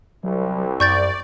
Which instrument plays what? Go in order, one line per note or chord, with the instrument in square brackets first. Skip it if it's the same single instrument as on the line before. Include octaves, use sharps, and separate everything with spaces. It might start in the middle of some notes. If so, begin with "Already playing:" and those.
[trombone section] C2 [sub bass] F#3
[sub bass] F#2 [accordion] D5 [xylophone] C#6 G6 A6